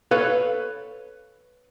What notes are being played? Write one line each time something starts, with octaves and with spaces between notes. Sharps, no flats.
A4 B4 C#5 F5